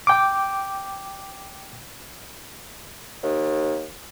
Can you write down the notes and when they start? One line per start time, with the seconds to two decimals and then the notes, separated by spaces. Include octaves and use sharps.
0.07 G5 D6
3.23 D#2